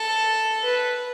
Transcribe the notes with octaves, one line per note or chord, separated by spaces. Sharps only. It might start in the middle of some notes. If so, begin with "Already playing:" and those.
Already playing: A4
B4